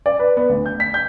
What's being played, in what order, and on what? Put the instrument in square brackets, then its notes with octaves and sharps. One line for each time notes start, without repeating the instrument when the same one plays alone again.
[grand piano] D5
B4
B3
D2
G6
B6
G6